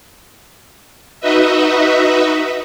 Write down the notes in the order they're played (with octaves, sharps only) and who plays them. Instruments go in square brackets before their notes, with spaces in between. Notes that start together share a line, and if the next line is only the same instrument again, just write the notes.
[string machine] D#4 F#4 B4 D#5 E5